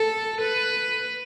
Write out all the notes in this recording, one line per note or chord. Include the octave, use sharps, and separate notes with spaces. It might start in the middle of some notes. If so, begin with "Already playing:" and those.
Already playing: A4
B4